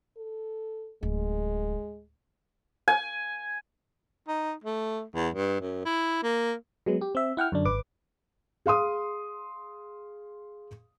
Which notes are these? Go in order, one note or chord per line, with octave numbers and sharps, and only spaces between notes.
A4
D1 G#3
G#5
D#4
A3
E2
G2
F#2
E4
A#3
F#3 G#3 B3
G4
C4 E5
E4 F#5 G5 F6
F#2 D3 D4
G#1 B4 D6
G#4 F5 C6 D#6